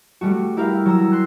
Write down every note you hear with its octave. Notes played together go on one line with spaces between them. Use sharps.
G3 A3 F#4
E4 G4 A#4 F5
F#3 A#5 E6
C6 F#6